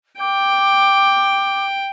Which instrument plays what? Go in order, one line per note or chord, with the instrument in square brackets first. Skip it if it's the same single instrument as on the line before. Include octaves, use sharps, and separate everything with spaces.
[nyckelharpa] G5 [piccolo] D6